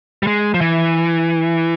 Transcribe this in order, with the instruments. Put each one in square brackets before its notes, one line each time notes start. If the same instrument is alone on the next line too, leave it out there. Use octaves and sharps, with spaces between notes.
[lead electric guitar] G3
G#3
F3
E3